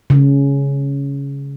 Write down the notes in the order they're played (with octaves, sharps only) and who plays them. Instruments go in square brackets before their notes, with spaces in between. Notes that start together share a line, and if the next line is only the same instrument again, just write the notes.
[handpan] C#3